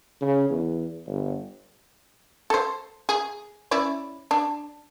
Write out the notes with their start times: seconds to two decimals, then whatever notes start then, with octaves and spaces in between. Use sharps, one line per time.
0.21 C#3
0.50 E2
1.07 G1
2.50 A4 C5
3.09 G#4
3.71 C#4 E4 D5
4.31 D4